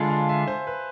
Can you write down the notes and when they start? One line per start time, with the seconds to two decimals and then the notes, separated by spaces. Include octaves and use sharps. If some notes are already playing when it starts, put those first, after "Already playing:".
Already playing: D3 G#3 D4 F4 G#5 B5
0.09 F5 A5
0.29 E5 G#5
0.47 C5
0.67 B4